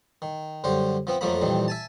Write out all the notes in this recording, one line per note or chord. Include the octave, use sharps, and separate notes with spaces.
D#3
F#2 D3 G3 C5
F3 B3 C4
F2 F3 F#3 A3 A#3 B5
F2 A#2 D#3 E3 G3
E5 G#5 A5